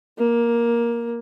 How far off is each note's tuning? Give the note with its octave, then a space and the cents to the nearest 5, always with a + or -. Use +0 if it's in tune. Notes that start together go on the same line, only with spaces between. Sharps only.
A#3 +10